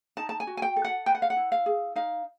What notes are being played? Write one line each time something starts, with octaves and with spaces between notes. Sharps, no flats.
D#4 A5
A5
G#5
F#4
G#5
G5
A4
F#5
B4 G5
F#5
F5
F#5
E4
F5
G#4
D#4 F5